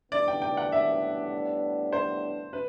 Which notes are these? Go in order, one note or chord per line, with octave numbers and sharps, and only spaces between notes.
A2 G3 B3 D4 D5
G5
G5
F#5
E5
C5
B4